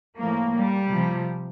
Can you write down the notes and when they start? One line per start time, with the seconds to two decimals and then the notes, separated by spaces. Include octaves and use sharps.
0.17 A2 F3 A#3
0.55 G3
0.91 C3 F3